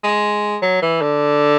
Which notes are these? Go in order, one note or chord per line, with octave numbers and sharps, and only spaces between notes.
G#3
F#3
E3
D3